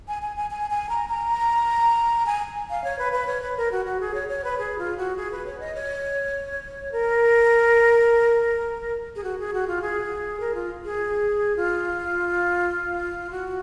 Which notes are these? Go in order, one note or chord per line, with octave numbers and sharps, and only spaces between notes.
G#5
G#5
G#5
G#5
G#5
A#5
A#5
G#5
F5
C#5
B4
B4
C#5
B4
A#4
F#4
F#4
G#4
C#5
C#5
B4
G#4
F4
F#4
G#4
B4
C#5
D#5
C#5
A#4
G#4
F#4
G#4
F#4
F4
G#4
A#4
F4
G#4
F4
F#4